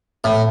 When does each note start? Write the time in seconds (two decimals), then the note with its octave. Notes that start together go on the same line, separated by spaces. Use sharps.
0.24 A2